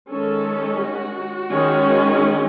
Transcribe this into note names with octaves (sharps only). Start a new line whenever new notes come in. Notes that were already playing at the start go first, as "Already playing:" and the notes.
D#3 G#3 C#4 A4
F#4
D#3 G#3 C#4